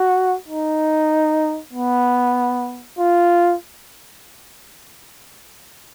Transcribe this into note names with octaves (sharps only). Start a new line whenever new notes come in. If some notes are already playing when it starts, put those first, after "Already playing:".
Already playing: F#4
D#4
B3
F4